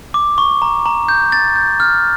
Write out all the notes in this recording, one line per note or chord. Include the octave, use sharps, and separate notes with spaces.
D6
C#6
A#5
A#5
G6
A6
G6
F6